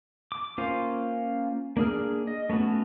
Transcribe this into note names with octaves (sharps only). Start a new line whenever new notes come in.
D6
A#3 C#4 F4 C5 F5
A#3 D4 G#4 F6
D#5
A3 B3 C#4 F#4